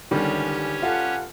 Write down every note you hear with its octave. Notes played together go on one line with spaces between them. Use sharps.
C#2 D3 D#3 G3 C#4 G4 C#5
F4 A4 F#5